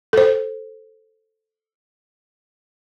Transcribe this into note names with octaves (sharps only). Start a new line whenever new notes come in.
A4 C5